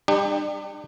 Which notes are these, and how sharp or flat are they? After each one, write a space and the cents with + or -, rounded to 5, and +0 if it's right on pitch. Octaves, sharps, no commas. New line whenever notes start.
G3 +30 D4 +45 G4 +15